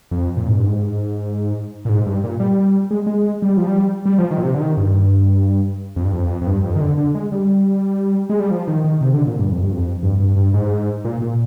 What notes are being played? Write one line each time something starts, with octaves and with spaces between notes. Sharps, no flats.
F2
A#2
G#2
G2
G#2
A#2
G#2
G2
A#2
G3
G#3
G#3
G3
F3
G3
G3
F3
D#3
A#2
C3
D3
D#3
G2
F2
G2
F2
F2
G2
F2
D#3
D3
D3
G#3
G3
G#3
G3
F3
D#3
D#3
C3
D3
A#2
G2
F2
G2
F2
G2
G2
G2
G#2
A#2
A#2